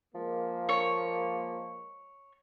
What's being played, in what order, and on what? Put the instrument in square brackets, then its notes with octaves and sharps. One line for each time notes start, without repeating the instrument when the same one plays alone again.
[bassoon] F3 [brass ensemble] G#3 A#3
[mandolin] C#5